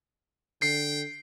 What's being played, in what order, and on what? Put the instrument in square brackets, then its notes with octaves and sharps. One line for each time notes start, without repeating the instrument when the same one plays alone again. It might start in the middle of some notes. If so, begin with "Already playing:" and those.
[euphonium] D3 [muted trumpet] G5 [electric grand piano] C7